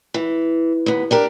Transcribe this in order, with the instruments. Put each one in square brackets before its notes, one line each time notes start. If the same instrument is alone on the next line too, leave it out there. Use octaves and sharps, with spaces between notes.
[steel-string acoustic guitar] E3
D#2 B3
D4 G4 A#4